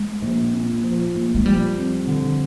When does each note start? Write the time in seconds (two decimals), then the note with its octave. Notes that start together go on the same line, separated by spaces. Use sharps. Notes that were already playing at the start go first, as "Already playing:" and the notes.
Already playing: G#3
0.22 A#1
0.53 A#2
0.83 F3
1.15 A#1
1.35 G#3
1.45 F3 G3
1.76 F2
2.07 D3